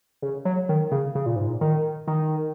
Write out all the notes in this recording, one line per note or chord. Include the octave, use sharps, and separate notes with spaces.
C#3
F#3
D#3
C#3
C#3
A#2
G#2
A#2
D#3
D#3